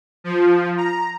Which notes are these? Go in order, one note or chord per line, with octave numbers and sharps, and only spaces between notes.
F3
A#5